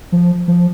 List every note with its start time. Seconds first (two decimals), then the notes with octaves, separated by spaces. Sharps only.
0.12 F3
0.48 F3